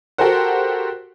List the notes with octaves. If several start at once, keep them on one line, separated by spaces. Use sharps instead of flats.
F#4 G4 A4 A#4 C5 F#5